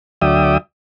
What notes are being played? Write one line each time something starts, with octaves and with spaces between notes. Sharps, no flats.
D2 F#3 D5 E5 G5 D#6